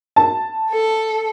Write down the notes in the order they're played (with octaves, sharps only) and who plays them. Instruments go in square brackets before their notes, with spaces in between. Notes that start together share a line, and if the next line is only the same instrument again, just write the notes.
[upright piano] A5
[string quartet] A4